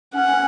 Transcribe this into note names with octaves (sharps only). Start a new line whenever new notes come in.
C#4 F#5